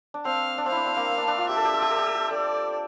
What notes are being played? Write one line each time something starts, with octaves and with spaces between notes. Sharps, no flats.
D4
C4 F5
D4
C4 F5
D4 E4
C4
A#3
D4
D4
F4
G4 E5
A4
G4
A4
G4
A4
G4
A4
G4
A4 D5